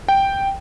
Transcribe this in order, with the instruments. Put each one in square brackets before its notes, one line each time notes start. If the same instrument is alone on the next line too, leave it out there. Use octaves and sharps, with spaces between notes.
[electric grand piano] G5